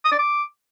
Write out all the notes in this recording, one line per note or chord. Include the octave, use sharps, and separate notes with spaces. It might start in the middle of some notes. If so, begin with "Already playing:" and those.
D#6
D5
D6